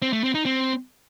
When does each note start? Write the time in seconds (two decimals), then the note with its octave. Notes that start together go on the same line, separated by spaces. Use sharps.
0.02 C4
0.13 A3
0.24 C4
0.35 D#4
0.45 C4